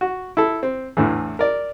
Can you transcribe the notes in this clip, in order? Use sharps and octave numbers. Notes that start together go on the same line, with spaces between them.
F#4
E4 A4
C4
E2 A2 D3 E3
A#4 D5